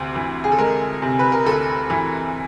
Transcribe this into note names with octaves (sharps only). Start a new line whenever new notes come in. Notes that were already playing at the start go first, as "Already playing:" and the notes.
Already playing: D2 C3
E3
G#4
A4
G#3 A#4
C3
B4
A#4
D2 A4
E3